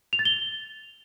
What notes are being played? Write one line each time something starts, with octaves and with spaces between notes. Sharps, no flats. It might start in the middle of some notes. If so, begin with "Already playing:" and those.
F7
A6
G7